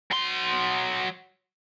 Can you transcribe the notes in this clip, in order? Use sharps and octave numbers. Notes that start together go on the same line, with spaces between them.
F#3 C6